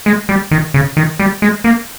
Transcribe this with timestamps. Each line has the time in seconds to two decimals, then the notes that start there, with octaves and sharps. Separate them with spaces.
0.06 G#3
0.29 G3
0.51 D#3
0.74 C#3
0.97 D#3
1.19 G3
1.42 G#3
1.64 A#3